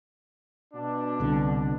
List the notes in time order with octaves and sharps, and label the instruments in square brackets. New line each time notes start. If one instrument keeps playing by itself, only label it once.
[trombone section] B2 D4
[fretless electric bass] C2 D3